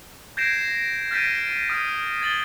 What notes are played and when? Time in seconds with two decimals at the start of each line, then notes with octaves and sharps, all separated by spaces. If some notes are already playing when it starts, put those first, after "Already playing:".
0.37 G6 G#6 A#6 C7 D7 E7
1.11 F6 G6 A6 B6 D7 D#7
1.70 D#6 F6 G#6 D#7
2.21 G#6 A6 F#7 G7